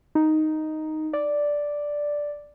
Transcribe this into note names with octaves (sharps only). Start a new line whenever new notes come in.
D#4
D5